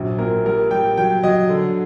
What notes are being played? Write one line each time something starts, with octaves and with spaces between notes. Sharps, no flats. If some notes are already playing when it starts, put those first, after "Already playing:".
Already playing: A#1 F#3
A#2 A#4
G3 A#4
G3 G5
F#3 G5
F#3 D#5
D3